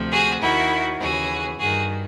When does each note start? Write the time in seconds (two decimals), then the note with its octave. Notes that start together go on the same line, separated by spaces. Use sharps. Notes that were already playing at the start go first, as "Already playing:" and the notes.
Already playing: D2 C3 F3
0.12 F#4 G#4
0.41 D#2 D#3 E4 F#4
1.00 D#2 C#3 E3 F#4 G#4
1.59 G2 D#3 F#4 G#4